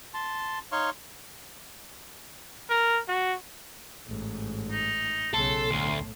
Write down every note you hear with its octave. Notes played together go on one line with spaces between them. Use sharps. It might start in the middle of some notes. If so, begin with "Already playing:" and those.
A5 C6
D#4 C#5 F5 C6 C#6
A#4
F#4
A1 G#2
D#4
B1 C#3 A4 C6
D2 A2